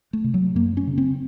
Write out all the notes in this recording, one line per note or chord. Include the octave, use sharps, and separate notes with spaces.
A3
C3
F#3
F#2 A#3
C#4
C#3
C4